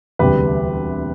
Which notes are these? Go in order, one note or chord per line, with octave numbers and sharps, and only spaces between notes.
E1 D2 C3 G3 G4 B4